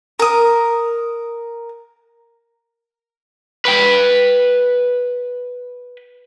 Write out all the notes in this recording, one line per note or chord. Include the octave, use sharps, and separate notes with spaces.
A#4 D#6
B4 G5